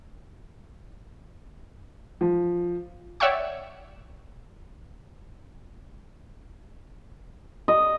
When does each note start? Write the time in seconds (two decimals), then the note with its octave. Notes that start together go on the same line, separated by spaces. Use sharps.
2.21 F3
3.20 C#5 D5 E5 F#5 G5 C#6
7.68 D#5